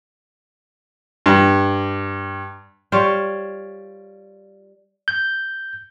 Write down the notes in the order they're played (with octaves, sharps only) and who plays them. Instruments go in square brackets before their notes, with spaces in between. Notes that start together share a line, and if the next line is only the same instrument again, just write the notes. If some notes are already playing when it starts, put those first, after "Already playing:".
[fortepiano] G2
[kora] G3 F4 C5 C#5
[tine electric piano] G6